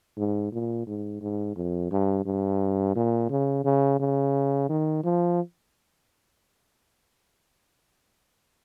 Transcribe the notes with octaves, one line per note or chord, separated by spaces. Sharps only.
G#2
A#2
G#2
G#2
F2
G2
G2
A#2
C#3
C#3
C#3
D#3
F3